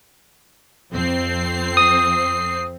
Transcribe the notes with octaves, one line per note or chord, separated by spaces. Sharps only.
F2 C4 C7
D#6